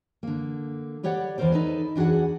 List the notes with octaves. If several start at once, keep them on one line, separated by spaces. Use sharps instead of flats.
D3 A#3
G3 G4 C#5 D5 F#5
E2 D#3 A3 A#4 C5 D5
D#4 A4 B4
E2 D4 F#4 G#4 F#5